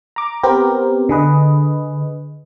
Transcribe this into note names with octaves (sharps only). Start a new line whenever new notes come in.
A#5 D6
B3 C4 G4 A#4
D3 G#4 B4 D#5